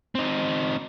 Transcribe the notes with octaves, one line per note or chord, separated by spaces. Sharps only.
C4 D#4